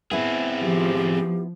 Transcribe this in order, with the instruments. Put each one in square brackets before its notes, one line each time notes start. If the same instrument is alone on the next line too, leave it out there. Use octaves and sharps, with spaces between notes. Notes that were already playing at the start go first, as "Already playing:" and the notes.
[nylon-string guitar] B3 E4 [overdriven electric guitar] C4 G#4
[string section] F3 [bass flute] G4